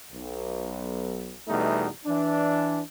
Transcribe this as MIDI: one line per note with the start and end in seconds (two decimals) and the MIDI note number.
0.11 1.32 35
1.47 1.87 40
1.47 1.87 47
1.47 1.87 55
1.47 1.87 57
1.47 1.87 63
2.05 2.80 52
2.05 2.80 62